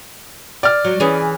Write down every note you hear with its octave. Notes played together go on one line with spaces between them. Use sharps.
D5 F6
F#3
E3 C#4 G#4